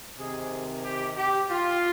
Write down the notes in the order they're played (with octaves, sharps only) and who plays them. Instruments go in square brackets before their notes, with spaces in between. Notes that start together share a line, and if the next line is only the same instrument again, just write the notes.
[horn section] C3 D#3 G#4
G4
G4
F4